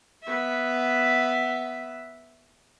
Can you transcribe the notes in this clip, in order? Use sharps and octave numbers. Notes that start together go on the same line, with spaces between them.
B3 E5